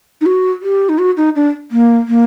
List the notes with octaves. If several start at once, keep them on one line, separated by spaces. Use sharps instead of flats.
D#4
F#4
G4
D#4
F#4
D#4
D4
A#3
A#3